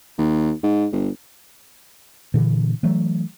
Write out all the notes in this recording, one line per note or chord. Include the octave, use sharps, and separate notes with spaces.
D#2
G#2
G1
A#2 D3 E3
E3 F#3 A3